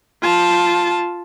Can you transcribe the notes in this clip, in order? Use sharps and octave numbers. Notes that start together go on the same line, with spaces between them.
F4 A5